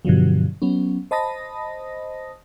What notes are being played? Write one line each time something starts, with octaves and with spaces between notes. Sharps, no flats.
G2 B2 D3 F3 F#3
F#3 B3 C#4
C5 D#5 A5 B5 D#6 A#6